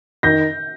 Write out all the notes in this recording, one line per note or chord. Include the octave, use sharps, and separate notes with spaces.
D#3 G6 A#6